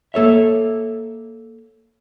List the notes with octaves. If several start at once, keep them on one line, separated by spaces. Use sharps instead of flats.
A#3 A4 C#5 E5